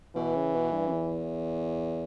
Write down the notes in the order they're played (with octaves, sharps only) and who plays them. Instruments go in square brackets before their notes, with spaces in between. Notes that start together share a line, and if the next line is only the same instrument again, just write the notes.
[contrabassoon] B2 [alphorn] E3
[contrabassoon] C#3
B2
G2
F#2
E2